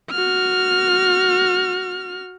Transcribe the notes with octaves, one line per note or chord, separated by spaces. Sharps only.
F#4 F6